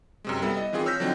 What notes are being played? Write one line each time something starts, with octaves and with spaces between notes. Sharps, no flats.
F#2 C3 G#3
G3 B3 E4 A4
D#5
D#3 E3 C4 F4 G#4
C#5 E6 F6 G6 A#6 B6
D3 F3 F#3 C4 D#4